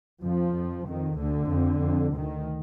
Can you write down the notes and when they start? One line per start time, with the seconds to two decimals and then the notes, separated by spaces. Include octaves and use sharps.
0.22 F2 F3
0.54 F2
0.87 F2 D#3
1.18 D2 D3
1.50 F2
1.82 F2
2.14 D2 D#3